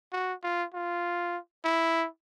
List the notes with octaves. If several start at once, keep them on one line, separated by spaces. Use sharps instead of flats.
F#4
F4
F4
E4